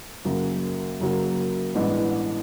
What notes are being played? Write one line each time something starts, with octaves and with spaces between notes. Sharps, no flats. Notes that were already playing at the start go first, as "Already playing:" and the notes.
F#2 C#3 F#3 A#3
F#2 C#3 F#3 A#3
A1 G2 E3 G#3 B3